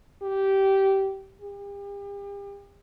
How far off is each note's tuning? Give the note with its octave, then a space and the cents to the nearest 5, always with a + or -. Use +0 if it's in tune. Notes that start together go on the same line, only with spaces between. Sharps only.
G4 -15
G4 +40